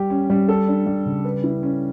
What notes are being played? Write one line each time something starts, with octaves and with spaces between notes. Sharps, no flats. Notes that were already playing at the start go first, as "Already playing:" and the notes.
Already playing: G3 G4
C#4
G3
A4
D4
G3
C#3
B4
E4
C#4